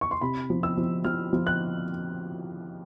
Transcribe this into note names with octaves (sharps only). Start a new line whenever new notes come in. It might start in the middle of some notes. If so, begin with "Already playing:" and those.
C#6
C6
C3 B5
F3
E6
F3
F3 F6
F3
F#6